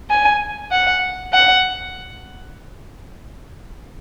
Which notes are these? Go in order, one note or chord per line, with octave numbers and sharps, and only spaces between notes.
G#5
F#5
F#5